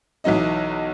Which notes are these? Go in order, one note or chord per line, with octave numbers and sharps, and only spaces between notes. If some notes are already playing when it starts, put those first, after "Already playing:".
B1 E3 F#3 D#4 D#5